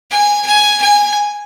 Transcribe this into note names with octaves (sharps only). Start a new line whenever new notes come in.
G#5
G#5
G#5